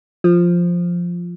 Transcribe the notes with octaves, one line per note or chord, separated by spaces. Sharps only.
F3